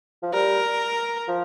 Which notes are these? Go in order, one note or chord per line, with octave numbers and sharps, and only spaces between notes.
F3
G3 A#4
F3